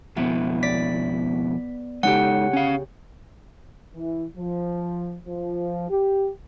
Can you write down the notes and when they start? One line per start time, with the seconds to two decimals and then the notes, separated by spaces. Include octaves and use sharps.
0.16 F2 B2 B3 E4
0.63 D5 B6
2.03 C#3 G#3 D#4 G4 A4 F#5
2.53 C#4 F5
3.95 E3
4.37 F3
5.27 F3
5.90 G4